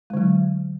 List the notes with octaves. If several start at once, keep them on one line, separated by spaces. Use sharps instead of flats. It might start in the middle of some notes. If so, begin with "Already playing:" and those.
D3 F#3 G#3